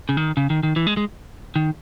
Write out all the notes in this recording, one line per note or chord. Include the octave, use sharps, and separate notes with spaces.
C#3
D#3
C#3
D#3
D#3
E3
G#3
G#3
D#3